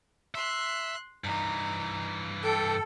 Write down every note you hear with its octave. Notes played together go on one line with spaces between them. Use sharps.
E5 C6 F#6
G2 E3 D#4
A4 G5